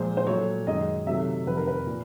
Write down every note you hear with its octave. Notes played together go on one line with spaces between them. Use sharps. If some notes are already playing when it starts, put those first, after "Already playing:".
Already playing: A#2 F3 G#3 C5
C5
A#2 F#3 A3 C#5
F#2 D#3 G#3 D#5
C3 D#3 F#3 A3 E5
F2 C3 D#3 G3 B4
A#4
B4
A#2